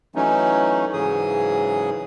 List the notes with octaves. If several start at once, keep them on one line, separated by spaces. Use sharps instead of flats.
E3 F#3 A3 C#4 D#4
G#2 C#3 E3 F#3 G#4 D#6